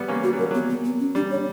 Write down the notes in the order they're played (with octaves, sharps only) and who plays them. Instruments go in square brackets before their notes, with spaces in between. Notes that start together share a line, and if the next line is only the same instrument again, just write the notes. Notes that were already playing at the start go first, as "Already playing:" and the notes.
Already playing: [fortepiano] G3 B3
A#3 C#4
[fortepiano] G3 [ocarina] F#4
[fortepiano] F#3
[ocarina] A#4
[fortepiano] F#3 [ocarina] B3
[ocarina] B3
B3
C#4
[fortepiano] G3 [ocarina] D4
[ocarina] C#5